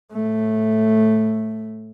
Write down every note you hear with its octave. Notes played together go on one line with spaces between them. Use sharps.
A2 A3